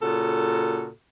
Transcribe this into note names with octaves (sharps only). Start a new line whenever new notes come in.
A#2 C#3 F#4 A4